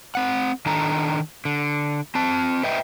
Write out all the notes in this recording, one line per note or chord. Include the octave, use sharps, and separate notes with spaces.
C4 F#5
D#3 D4 D#4 A4 A#5
D3
C4 A5
B4 D#5 E5 G5